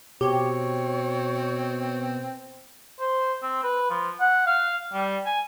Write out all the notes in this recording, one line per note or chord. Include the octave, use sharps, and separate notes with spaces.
B2 C4 G4 C#5
C5
C4
B4
F3
F#5
F5
G3
G#5